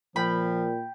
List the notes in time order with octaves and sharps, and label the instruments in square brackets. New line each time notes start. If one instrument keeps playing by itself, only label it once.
[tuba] A#2 [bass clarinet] F3 [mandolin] G5 B5